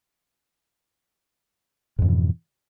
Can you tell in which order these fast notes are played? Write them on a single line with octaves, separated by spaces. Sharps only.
G#2 F2 E3 B2